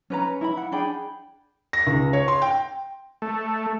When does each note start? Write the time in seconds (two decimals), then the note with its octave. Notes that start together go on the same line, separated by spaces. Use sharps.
0.10 C#4 B4 A#5
0.41 E4 B5
0.57 F#5
0.72 D4 G#4 G5 B5
1.73 A#6
1.87 C#2
2.13 C#5
2.28 C6
2.42 G5
3.22 A3